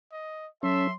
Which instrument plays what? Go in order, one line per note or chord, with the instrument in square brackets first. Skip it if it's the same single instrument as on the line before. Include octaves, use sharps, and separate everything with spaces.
[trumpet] D#5
[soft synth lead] F#3 [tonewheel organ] C#4 [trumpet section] A4 E5 [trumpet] C6